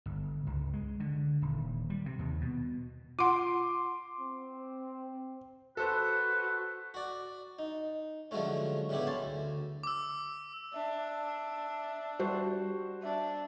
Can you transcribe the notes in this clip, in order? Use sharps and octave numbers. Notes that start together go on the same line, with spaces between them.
G1
C#2
G#3
D3
D#1
G3
C3
D#2
B2
F4 F#5 C6 D6
C4
F#4 A4 B4 C5
F#4 D5
D#4
D3 F3 F#3 G#3 A3 C#4
A2 C#3 G3 B3 E4 G4
C#4 A5 C6
D2
D6 E6
D4 E5
G3 F#4 C5
D4 E5